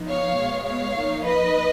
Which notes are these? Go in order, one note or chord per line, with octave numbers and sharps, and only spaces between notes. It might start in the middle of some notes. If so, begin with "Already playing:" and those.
Already playing: F3 B3 D#4
C#5 F5
B2 G#3 B3
C#5 F5
F3 A#3 D#4
B4 D#5